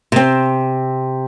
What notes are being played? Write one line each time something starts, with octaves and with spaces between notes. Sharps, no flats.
C3 C4